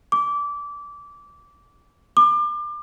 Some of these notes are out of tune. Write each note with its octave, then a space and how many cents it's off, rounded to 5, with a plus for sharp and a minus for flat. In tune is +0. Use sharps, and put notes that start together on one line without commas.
D6 -20
D6 +30